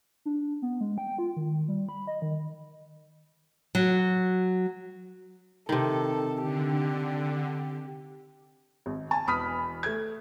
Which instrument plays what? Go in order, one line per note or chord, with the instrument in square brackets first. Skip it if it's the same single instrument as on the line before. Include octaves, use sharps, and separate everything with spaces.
[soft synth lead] D4
B3
G#3
G5
F4
D#3
G3
B5
D#5
D#3
[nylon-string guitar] F#3
[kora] C3 D#3 [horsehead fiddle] A4
[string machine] D3 [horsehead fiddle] G4
[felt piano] G#1
G#5 A5
E1 E2 B5 D#6 F6 B6
A3 G#6